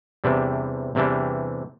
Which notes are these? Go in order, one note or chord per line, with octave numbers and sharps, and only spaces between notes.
E2 C3 E3 G3 D4
E2 C3 E3 G3 D4